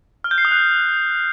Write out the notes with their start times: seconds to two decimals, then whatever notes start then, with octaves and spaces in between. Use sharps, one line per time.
0.24 F6
0.31 G6
0.38 C7
0.45 D#6
0.51 F#6